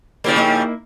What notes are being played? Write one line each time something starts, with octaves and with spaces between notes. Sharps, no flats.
C#3 F3 G3 A#3 E4 D5
A#3 D#4 E4